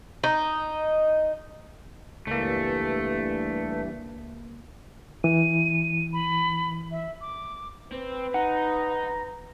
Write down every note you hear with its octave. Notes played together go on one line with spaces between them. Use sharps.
D#4
C#2 G2 E3 A3 A#3
E3 D#7
B5
E5
D6
C4 B4
D#4 F#5 A#5